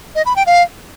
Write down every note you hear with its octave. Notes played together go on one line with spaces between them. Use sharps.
D#5
B5
G5
F5